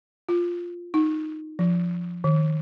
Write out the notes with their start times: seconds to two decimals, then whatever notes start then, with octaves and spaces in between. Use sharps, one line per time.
0.29 F4
0.94 D#4
1.59 F3
2.24 D#3